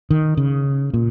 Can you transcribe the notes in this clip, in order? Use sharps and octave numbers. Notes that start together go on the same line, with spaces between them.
D#3
C#3
A#2